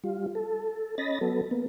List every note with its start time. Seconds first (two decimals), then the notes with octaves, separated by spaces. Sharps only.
0.04 G3 F4
0.35 A4
0.98 C#4 D#5 B5 A6 A#6
1.21 F#3 B3 A4
1.51 A#3 B3